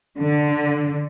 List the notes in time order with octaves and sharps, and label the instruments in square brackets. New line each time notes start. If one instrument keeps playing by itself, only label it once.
[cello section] D3